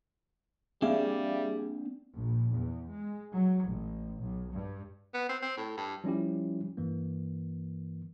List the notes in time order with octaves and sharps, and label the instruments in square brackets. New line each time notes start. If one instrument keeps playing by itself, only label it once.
[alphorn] G3 [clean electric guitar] A#3 C4 D4 [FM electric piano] G#4 E5 F5
[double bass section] A#1
E2
G#3
F#3
A1
B1
G2
[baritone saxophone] B3
C4
C4
A2
G2
[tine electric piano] F3 G3 C#4 E4 G4
G2 E3 A#3